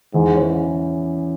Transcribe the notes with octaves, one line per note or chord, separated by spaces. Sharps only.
E2 G#2
E3 C#4